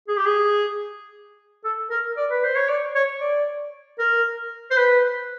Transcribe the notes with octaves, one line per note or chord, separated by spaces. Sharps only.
G#4
G4
G#4
A4
A#4
D5
B4
C5
C#5
D5
C#5
D5
A#4
C5
B4